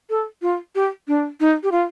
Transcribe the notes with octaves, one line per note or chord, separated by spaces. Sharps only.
A4
F4
G4
D4
D#4
G4
F4